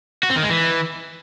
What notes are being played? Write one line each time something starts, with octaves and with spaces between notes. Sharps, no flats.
F#4
C4
D#3
G#3
E3